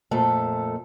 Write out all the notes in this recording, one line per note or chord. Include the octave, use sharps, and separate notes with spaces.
F2 A#2 A3 A4